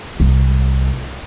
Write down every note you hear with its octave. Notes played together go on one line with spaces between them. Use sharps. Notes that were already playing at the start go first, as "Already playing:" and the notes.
C2